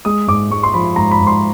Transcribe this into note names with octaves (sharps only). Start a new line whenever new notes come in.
G#3 D#6
G#2 D6
G#3 C#6
C6
F3 B5
G#2 A#5
B5
G#2
C6